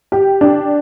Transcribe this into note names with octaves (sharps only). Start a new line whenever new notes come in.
G4
D4